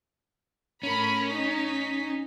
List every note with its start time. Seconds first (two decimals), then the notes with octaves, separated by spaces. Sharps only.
0.83 A2 C#4 A#4 B5
1.28 D#4 B6